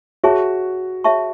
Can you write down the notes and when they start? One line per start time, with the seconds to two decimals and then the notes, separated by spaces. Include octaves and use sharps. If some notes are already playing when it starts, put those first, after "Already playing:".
0.24 F#4 G#4 C#5 E5 A5 C#6
1.04 G#4 C#5 E5 A5 C#6